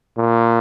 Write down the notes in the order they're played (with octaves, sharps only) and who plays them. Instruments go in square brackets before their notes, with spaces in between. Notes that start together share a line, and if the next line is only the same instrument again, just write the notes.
[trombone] A#2